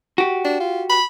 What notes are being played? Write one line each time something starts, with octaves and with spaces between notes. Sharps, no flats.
F#4 G4
D4
F4
B5